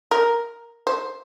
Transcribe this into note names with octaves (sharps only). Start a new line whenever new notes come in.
A#4
C5